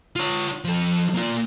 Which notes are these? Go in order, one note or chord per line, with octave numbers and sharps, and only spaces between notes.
F4 C#5
F3 A4
A#3 F4